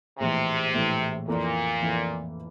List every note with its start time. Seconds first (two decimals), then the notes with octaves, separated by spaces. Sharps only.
0.19 A#1 A2 C3 E3
0.73 A#1 A2 E3
1.28 F2 A#2 E3 A#3
1.81 F2 E3 A#3